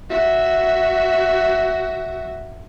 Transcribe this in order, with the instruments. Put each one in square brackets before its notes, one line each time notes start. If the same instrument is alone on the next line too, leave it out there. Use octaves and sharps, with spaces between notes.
[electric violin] F#4 E5